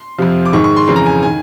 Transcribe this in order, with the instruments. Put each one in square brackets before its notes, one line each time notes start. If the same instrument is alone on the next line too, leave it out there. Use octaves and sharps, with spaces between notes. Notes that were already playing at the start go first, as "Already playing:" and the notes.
Already playing: [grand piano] C6
F2 C3 F3
D6
G#2 D#3 C#6
C#6
C6
F2 C#3 E3 C6
A#5
G#5
D#3 G#5